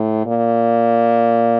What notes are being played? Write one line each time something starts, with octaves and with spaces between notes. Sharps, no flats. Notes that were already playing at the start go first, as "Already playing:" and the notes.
Already playing: A2
A#2